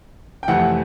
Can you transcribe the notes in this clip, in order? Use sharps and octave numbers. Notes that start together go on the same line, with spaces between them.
G5
F2 C3 E3 A3 F#5